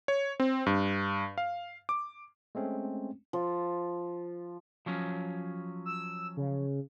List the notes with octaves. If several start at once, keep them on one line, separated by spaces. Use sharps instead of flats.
C#5
C4
G2
F5
D6
G#3 A3 C4 C#4
F3
F3 F#3 C#4
E6
C#3